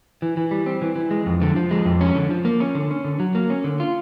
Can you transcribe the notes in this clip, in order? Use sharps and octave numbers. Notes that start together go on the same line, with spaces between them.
E3
E3
G3
C4
E3
E3
G#3
F2
D3
F3
G#3
F2
C#4
D3
F3
A#3
C#4
D3
C#4
D3
F#3
A#3
C#4
D3
F4